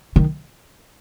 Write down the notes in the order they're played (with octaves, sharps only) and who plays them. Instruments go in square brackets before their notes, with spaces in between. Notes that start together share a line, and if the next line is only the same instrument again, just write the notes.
[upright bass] D#3